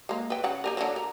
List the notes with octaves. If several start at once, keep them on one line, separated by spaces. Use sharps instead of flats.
G#3 A#3
B4 G5
C#3 F#5
D#4 G4 A#4
D3 E3 F#3
A#4